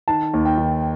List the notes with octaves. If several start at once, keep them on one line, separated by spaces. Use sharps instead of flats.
D#3 A5
D#2
G5
D#3